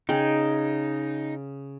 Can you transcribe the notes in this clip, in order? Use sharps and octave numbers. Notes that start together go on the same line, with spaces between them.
C#3 D#4 G#4 G5